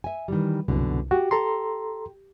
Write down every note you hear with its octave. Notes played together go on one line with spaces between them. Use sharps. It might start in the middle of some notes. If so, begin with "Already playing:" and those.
E5 G#5
D#3 E3 G3
C2 F#2 B2 D3
F#4 G4
A4 A#5 C6